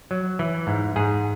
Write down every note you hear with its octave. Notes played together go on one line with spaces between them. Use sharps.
F#3
E3
G#2
G#2 G#4